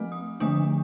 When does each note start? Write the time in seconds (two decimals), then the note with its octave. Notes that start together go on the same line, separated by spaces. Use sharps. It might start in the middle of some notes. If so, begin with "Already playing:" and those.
Already playing: F3 A3 C4
0.12 D#6
0.40 D3 F3 A3 D4 D#6